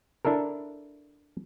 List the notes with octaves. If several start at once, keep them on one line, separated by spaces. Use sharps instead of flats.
D4 E4 A4 A#4